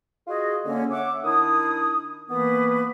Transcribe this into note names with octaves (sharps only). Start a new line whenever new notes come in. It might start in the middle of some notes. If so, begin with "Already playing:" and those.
F4 F#4 G#4 D#5
D3 A#3 C#4
C#5 E5 F#5 D6
D#3 D4 E4 D#6
D#3 E3 A#3 B3 B4 D#6